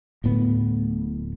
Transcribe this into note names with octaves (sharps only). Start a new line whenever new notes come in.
D1 A2 B3